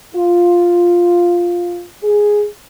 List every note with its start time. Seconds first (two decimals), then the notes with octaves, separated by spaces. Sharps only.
0.15 F4
2.03 G#4